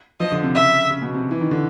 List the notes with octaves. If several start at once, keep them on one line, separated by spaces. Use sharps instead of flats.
F3 D#5
D3
C3
C#3 E5
C#3
B2
C3
E3
D#3
D3